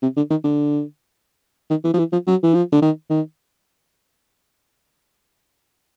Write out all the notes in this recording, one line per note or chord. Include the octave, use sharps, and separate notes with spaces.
C3
D3
D#3
D3
D#3
E3
F3
E3
F3
F#3
E3
F3
D3
D#3
D#3